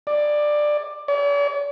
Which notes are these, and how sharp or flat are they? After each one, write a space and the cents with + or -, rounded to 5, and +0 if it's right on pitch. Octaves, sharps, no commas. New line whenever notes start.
D5 +15
D5 -45